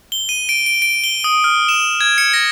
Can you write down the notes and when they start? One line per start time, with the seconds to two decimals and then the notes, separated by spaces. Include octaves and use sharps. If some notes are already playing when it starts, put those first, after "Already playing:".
0.12 G7
0.29 D#7
0.49 D7
0.66 D7
0.82 D7
1.04 G7
1.24 D#6
1.44 F6
1.69 E7
2.01 G#6
2.18 C#7
2.34 A#6